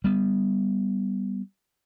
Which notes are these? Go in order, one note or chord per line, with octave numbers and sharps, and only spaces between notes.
G3 B3